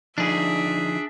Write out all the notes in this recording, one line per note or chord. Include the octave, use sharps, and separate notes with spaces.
D3 F3 D4 D#4 G#4 E5